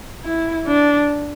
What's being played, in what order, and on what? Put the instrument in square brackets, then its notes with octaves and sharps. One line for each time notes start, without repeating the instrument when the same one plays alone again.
[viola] E4
D4